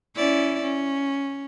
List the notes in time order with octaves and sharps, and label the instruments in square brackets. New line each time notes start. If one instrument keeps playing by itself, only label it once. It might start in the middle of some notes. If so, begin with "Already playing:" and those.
[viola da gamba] C#4 E4 D5
C#4